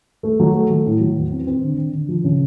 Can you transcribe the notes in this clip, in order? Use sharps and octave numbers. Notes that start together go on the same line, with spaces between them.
A3
F#3
A3
F#3
A2
F#3
E2
C4
C4
D3
D3
D3
F3
C#3